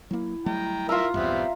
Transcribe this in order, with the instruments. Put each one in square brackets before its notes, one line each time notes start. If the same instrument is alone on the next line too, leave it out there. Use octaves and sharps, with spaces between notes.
[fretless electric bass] F#3 A#3 [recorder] E4
[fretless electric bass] F#3 G3 A3 [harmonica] G5 A#5
[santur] F4 A#5 [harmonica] A#4 E5 E6
[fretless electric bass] A#1 E2 G2 [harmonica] G3 B3 C4 [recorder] E5